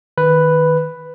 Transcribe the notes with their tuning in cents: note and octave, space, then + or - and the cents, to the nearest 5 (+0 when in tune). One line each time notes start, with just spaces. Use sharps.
D#3 +0 B4 +0